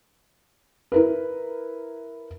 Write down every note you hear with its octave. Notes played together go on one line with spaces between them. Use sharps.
E4 A#4 B4